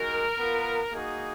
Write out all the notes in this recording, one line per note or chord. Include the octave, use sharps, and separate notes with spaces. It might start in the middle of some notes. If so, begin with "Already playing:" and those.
Already playing: G#3 D#4 F#4 A#4
B3 F4
A#3 D#4 F#4 G#4